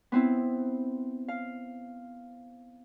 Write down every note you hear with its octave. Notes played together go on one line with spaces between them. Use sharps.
B3 C4 E4
F5